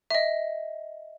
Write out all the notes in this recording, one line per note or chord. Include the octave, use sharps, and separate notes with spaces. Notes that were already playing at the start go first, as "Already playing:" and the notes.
D#5 E5